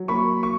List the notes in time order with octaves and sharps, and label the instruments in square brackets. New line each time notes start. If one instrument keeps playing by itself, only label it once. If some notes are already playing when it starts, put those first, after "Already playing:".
Already playing: [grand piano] F#3
A#3 B5 C#6
C#6